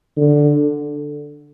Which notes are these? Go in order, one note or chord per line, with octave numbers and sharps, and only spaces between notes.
D3